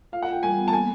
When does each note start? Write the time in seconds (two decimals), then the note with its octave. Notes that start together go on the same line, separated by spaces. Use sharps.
0.12 F4 F5
0.23 F#5
0.28 F4 G5
0.43 G3 G#5
0.58 B3
0.68 A5
0.73 A#3 G#5